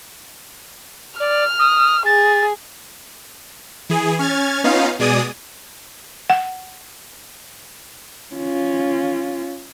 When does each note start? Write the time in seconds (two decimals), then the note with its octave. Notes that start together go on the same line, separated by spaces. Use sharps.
1.20 D5 F6
1.59 D#6
2.06 G#4 A6
3.89 E3 G#4
4.19 C#4 F6 G#6 A6
4.64 B3 C#4 D#4 F4 F5
4.99 B2 G#3 D5 G#5 D#6
6.30 F#5
8.35 C#4 F4